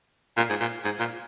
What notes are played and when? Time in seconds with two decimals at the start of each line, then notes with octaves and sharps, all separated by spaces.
0.37 A#2
0.49 G#2
0.60 A#2
0.84 G#2
0.99 A#2